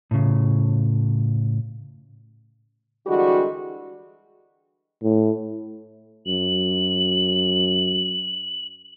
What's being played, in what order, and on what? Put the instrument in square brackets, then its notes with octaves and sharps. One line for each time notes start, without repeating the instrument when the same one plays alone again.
[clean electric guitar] A2 C#3
[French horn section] D3 E3 G3 G#3 F#4
[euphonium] A2
[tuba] F#2 [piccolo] F#7